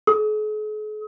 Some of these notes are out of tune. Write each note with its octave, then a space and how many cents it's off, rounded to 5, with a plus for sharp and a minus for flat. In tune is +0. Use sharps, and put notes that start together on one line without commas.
G#4 +45 D#6 +40